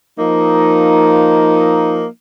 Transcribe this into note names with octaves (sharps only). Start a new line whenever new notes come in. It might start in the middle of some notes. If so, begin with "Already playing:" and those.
F3 A#3 D#4